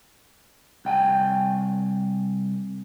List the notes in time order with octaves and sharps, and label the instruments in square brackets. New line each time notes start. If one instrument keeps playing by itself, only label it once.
[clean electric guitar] C2 G5 G#5